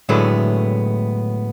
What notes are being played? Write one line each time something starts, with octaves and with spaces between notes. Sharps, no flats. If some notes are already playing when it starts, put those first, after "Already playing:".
A2 D3 F#3 G#3 A3 B3